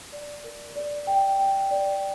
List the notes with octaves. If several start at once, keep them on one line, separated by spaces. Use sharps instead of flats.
D5
A#4
D5
G5
G5
D5